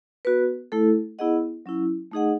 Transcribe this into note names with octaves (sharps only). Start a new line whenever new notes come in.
B3 F#4 B4
A3 E4 A4
B3 E4 G#4 D#5 F#5
F#3 C#4 E4
A3 D#4 G#4 D#5 F#5